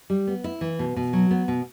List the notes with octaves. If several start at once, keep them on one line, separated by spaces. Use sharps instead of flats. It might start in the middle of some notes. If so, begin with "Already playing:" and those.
G3
B3
E4
E3
B2
B2
F#3
B3
B2